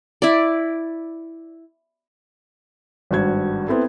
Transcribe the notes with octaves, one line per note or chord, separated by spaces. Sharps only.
E4 D5
G#1 G2 F#4 G#6
B3 C4 E4 A4